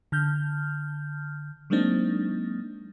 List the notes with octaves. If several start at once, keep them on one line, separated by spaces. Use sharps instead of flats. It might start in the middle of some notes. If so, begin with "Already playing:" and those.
D3 F6 G6
F#3 G#3 A#3 C4 D4 D#4